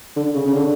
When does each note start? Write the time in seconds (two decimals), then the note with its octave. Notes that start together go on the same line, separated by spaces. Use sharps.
0.16 D3
0.35 C#3
0.46 C#3
0.53 D3